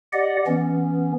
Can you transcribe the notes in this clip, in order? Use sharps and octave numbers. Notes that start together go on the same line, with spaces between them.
G4 D5 D#5 F#5
E3 B3 C#4